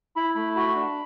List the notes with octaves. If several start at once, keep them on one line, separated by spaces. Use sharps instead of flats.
E4 B5
A3 B5
F#4 B5
D4